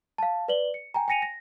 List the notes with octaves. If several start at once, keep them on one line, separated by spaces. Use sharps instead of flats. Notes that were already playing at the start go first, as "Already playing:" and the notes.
F5 A5
B4 D5 F#7 G7
C#7
G5 G#5 A#5
G5 G#5 A#6 C#7 D#7 F7
A#6